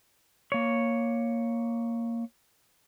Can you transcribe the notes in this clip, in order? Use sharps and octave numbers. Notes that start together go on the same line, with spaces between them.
A#3 C#5